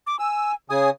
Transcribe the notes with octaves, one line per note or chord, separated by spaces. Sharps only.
D6
G#5 E6
C#3 G#4 G#5 D#6